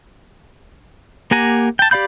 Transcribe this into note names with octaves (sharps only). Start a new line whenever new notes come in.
A#3 G4 F#5 G#5 A#5
G5 A5
G4 D5 F5 B5 G6